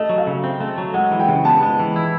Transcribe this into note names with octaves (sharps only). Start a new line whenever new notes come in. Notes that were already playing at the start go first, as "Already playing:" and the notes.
Already playing: A3 D#5
F#3
F5
C#3
C4
A3
F#3
G#3 F#5
E3
G5
C#3
B3 A5
G#3
E3
E4